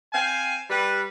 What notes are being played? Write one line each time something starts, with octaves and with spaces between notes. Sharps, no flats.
C4 F5 G5 G#5
G3 B4